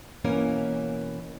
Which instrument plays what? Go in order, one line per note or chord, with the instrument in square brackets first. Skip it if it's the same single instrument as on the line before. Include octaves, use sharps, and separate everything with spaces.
[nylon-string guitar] B2 E3 A#3 C#4 A#4